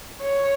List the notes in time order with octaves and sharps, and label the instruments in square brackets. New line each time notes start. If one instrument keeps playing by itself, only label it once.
[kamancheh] C#5